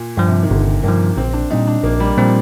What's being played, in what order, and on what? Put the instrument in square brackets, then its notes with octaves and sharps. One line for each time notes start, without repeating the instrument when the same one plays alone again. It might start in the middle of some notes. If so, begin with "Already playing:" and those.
Already playing: [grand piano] A#2
[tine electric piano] G2 F3 [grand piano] A#2
[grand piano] C3
D#3
[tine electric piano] G1 [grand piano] D3
[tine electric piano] G2 F3 [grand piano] A#3
[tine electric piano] A#1 [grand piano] C4
[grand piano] D4
[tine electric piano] A#2 G3 C4 [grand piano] D#4
[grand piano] D4
[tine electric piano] A#1 [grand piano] A#3
[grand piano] G3
[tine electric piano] A#2 G3 C4 [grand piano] F3